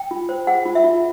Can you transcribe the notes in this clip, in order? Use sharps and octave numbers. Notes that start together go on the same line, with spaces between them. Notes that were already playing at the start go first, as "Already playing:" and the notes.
Already playing: G5
F4
C5
G#4 F#5
F4
E5
F4